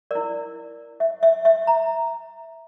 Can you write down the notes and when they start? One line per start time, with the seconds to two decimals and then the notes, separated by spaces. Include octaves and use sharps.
0.11 E4 A#4 D5
1.00 E5
1.23 E5
1.45 E5
1.67 A#5